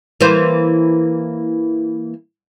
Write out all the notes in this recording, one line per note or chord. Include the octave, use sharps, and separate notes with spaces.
E3 A#3 C5